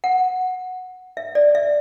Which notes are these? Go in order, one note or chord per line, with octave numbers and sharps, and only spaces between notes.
F#5
E5
D5
E5